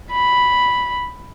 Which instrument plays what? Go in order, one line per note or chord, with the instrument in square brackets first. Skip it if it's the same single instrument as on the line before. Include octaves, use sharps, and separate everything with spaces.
[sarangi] B5